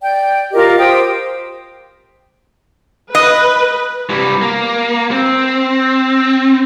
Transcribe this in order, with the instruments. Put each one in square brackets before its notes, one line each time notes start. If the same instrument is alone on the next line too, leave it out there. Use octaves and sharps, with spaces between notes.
[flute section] D5 G5
F4 G4 A#4 D#5
G4 C5 G5 D#6
[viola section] B4 [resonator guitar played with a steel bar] D#5
[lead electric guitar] E3 G3
A#3
C4